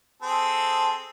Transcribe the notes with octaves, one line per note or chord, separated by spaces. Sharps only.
C4 G#4 A4